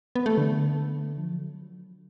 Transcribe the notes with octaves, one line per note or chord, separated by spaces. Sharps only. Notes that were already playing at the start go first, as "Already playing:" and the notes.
B3
A3
D3
F3
F#3